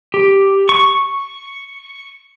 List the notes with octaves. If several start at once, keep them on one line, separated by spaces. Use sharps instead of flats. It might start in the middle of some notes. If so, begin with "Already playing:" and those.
G4
C#6